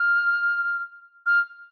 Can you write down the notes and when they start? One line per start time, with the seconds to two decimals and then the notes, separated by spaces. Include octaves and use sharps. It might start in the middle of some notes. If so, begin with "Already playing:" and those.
Already playing: F6
1.26 F6